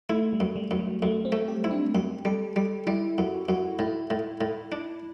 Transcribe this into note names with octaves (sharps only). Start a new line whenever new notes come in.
A3 E4
G3
F#2
G3
F#2
F#3
F#2 A3
C4
A3
G4
E4
D4
F#2 G4
G3 A4
G3 G4
G3 E4
F#2 F#4
F#2 F#4
A2 E4
A2
A2
D4